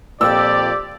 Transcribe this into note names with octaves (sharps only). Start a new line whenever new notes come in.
F2 A#2 G4 D5 E6